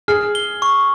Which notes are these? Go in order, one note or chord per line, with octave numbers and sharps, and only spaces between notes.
G#4 F6
G7
C#6